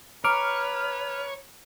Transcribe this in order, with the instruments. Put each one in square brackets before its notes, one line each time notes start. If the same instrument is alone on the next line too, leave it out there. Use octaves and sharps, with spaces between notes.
[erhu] B4 [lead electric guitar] C#5 [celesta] A#5 D6 D7 [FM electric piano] F6